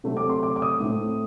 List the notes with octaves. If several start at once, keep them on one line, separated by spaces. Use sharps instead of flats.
C3 F#3 A3 C4
D6
C6
D6
D6
D#6
A2 A3 C4